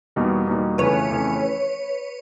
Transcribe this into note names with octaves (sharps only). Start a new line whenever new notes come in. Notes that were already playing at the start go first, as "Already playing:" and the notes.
E2 B2 G3 A#3 D#4
E2 B2 G3 A#3 D#4
F2 C#3 E3 A3 C#4 B4 C#5
F2 C#3 E3 A3 C#4